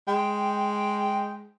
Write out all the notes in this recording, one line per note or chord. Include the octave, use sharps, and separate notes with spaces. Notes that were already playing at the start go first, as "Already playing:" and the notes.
G#3 G5